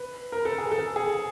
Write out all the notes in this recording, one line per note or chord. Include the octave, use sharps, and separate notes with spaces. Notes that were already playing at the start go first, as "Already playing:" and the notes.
Already playing: B4
A#4
A4
G#4
A4
G#4